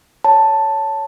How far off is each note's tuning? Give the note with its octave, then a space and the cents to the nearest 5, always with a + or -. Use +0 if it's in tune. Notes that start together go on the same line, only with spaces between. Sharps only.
C#5 +15 A5 +5